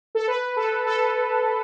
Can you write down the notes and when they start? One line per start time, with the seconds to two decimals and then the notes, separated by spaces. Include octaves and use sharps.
0.15 A4
0.27 B4
0.56 A4
0.87 A4